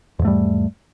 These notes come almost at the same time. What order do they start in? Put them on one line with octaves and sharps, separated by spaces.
E2 G#2 A3 G3